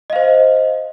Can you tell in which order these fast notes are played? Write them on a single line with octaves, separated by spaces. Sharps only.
D#5 F5 C5